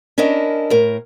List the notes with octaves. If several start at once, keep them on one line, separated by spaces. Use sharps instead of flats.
C#4 D4 E4 A#4 D#5
A2 A#4